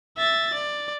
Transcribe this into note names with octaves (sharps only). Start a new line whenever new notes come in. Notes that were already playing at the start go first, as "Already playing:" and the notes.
E5 A6
D5